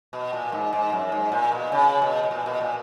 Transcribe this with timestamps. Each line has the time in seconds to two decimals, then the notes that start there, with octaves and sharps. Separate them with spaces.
0.13 B2
0.33 A#2
0.52 G#2
0.73 G#2
0.92 F#2
1.12 G#2
1.32 A#2
1.52 B2
1.72 C#3
2.02 B2
2.23 B2
2.31 A#2
2.46 B2
2.61 A#2